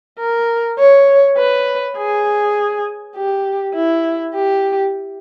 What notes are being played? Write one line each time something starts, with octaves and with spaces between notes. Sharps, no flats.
A#4
C#5
B4
G#4
G4
E4
G4